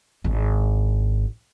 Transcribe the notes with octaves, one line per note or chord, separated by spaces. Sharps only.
G#1 D4